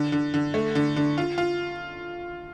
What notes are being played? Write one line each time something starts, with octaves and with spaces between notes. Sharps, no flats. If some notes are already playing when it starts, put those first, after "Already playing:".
Already playing: D3
D3
D3
A3
D3
D3
F4
F4